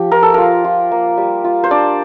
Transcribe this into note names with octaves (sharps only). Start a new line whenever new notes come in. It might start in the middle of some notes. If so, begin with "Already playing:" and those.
Already playing: F3 G4
F4 A#4
A4
F4 A#4
F4
A#3
G3
F4
C5
D4 D5